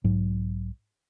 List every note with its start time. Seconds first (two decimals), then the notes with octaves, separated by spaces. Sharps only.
0.04 B1 G#2 F#3